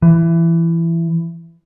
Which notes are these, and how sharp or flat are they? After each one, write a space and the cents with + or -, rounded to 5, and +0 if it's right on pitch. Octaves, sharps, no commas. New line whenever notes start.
E3 +20